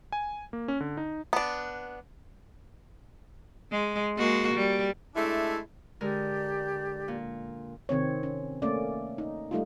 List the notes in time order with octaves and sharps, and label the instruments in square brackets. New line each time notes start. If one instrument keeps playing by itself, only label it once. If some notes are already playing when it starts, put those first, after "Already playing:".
[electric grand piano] G#5
A#3
C#4
D3
D#4
[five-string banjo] B3 D4
[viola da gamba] G#3
G#3 A#3 F#4
G3
[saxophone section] G#3 A3 D4 E4
[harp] D3 G#3 A#4 [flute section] G4 D5
[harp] A#2
[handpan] C3 D#3 C4 C#5
C#4
A3 A#3 C#4 D5
D#4
G3 A3 D#4 F4